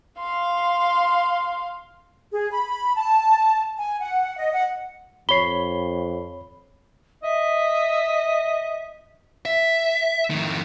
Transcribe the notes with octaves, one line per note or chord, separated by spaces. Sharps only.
F5 C6
G#4
B5
A5
G#5
F#5
D#5
F#5
F2 C#5 B5 C7 G7
D#5 E5
E5
F2 D#3